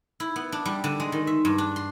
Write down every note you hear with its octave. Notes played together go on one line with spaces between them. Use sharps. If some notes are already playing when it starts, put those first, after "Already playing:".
E4
B3
D4
G3
D3
G#3
D#3
E5
G2
D4
C6